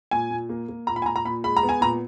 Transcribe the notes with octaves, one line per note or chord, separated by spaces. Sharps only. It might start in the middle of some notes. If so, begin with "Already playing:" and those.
A#2 G#5
A#2
A#3
A#3
A#2 A#5
B5
G#5
A#2 A#5
A#5
A#2 B5
G#3 B5
A#5
B3
G#5
A#2 A#5